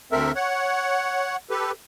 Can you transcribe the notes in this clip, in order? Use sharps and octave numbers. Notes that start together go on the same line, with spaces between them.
D2 C4 A4 A#4 E5
C#5 F#5
G4 A4 B4